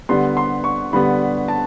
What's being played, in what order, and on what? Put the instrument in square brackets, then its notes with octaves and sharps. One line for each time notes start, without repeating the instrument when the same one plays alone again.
[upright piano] D3 G3 B3 C6
C6
C#6
D3 G3 B3 B5
A5